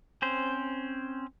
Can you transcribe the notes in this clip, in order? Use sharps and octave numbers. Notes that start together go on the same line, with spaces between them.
C4 C#4 C5